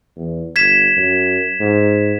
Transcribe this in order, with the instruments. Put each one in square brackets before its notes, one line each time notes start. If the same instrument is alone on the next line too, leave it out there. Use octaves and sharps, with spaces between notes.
[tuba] E2
[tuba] G1 [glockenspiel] G#6 B6 E7
[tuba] F#2
G#2